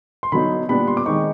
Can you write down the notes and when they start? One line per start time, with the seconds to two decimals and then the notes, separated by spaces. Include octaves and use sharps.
0.23 C6
0.32 D3 F#3 B3 D#4 B5
0.69 A#2 G3 B3 D4 B5
0.88 C6
0.97 D6
1.06 D#3 G#3 C4 D#4 C#6